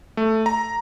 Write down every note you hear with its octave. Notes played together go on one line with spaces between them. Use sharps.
A3
A#5